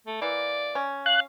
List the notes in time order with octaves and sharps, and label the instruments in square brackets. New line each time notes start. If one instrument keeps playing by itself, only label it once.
[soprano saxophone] A3
[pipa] E3 A#3 [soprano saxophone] D5
[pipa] C#4
[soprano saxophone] F5 [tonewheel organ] F#6